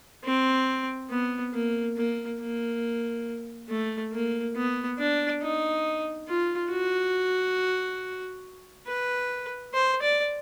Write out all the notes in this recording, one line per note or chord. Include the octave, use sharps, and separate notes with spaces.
C4
B3
A#3
A#3
A#3
A3
A#3
B3
D4
D#4
F4
F#4
B4
C5
D5